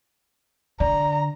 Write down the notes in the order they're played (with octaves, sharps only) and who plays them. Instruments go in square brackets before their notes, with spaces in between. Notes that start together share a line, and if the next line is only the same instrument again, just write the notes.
[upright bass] D3 [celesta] D5 [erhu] A#5